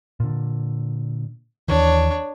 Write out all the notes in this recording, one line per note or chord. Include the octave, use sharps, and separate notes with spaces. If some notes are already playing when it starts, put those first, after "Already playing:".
A#2 D3
D#2 D#3 E3 D4 C#5